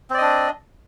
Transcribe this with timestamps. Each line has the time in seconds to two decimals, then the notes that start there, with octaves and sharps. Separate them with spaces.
0.10 C4
0.14 D5
0.18 D#5
0.22 D4